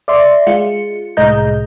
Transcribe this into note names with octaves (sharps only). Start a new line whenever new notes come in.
D5 E5 C6
G#3 F4 C#7
C2 A2 G#3 D#5 A#5 G6